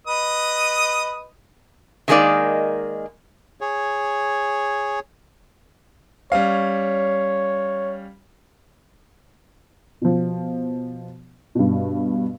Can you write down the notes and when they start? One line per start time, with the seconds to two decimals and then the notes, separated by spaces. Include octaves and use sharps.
0.07 B4 D#5 D#6
2.08 D#3 F3 G#3 A#3 D#4 D5
3.61 G#4 C#5
6.32 G3 C#4 C#5 F5
10.02 B2 F3
11.55 G2 B2